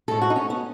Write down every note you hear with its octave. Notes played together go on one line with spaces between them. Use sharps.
A2 G#3 A4
F#4
D#4
C#4
B3